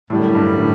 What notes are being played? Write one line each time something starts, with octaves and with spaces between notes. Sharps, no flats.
F#2 A2 D3 G3
G2
A2